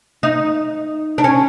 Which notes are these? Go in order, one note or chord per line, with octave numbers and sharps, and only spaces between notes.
D#4
D4
C#4